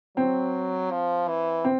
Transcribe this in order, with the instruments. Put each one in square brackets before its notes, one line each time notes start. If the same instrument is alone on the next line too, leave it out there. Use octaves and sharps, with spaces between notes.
[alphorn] F#3 [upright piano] C4
[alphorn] F3
E3
[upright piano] C4